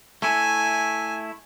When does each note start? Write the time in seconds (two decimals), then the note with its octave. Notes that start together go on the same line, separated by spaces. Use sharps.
0.22 A3 E4 G#5